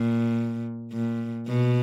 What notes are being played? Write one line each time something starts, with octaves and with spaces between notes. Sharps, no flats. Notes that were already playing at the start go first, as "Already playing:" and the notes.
Already playing: A#2
A#2
B2